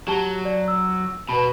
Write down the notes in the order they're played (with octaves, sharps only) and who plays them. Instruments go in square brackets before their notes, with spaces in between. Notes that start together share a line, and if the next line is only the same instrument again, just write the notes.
[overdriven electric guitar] F#3 [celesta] G4 A5 G7
[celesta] D5
E6
[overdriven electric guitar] B2 [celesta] B4 A5 B5